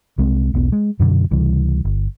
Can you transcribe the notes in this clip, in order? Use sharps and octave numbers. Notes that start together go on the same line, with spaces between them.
C2 G#3 C4
E1 B1 B3
G#3
F#2 B2 D3 F#3
C#2 C3 E3 G3
G1